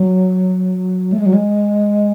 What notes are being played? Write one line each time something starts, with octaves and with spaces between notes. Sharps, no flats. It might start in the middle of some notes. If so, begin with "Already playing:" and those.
Already playing: F#3
A3
G#3
F#3
G#3